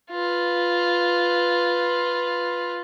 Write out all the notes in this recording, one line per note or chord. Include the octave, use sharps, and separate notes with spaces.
F4 B4